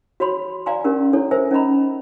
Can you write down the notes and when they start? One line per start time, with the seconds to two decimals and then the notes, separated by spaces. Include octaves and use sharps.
0.20 F#4 C#5 B5 C6
0.66 D5 F5 G#5 A#5 C6
0.84 C#4 D4 G4 A#4
1.13 D4 E4 A4 C#5
1.31 A#4 C5 E5 G#5
1.51 C#4 D#4 D#5 A#5 B5